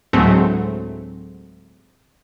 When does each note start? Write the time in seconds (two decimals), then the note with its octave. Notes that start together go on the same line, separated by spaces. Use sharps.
0.13 D2 A2 F#3 G#3 A3 C4